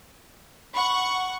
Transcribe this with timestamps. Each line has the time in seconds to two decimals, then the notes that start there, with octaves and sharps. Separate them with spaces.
0.74 F#5 B5 C#6